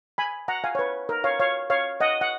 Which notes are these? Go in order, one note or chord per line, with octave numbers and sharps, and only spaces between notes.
G#5 B5
F#5 A#5
F5 G#5
C#5
B4
A#4
C#5 F5
C#5 F5
C#5 F5
D#5 F#5
F#5